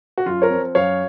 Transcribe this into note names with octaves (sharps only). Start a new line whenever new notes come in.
F#4
F#2 F4
A#4 C#5
F3 C4
F#2 C#5 F5